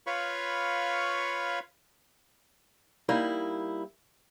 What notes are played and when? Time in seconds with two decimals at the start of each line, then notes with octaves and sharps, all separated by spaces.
0.07 F4 B4 C#5 F5 B5 C#6
3.09 G3 A#3 D#4 E4